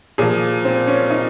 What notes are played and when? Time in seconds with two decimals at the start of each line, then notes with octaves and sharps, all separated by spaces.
0.18 A#2 F3 G#4
0.65 C4
0.87 C#4
1.10 D#4